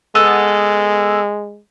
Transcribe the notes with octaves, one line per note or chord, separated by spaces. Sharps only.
G#3 B3 A4